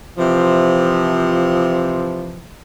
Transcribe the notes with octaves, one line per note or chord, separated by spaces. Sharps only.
C3 E3 F3